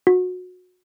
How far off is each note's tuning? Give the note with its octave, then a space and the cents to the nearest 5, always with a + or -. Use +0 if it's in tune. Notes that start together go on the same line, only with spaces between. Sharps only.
F#4 -25